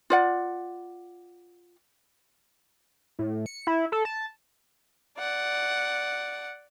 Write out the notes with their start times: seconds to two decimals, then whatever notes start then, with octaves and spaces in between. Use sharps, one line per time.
0.10 F4 D5 F#5
3.19 A2
3.46 C#7
3.67 E4
3.92 A4
4.05 A5
5.18 D5 F#5